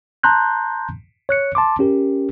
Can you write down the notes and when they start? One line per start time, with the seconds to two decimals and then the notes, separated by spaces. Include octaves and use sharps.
0.23 A5 A#5 C6 F#6 G6
1.29 C#5 F#6 C#7
1.55 A5 C6 D6
1.79 C#4 G4 A#4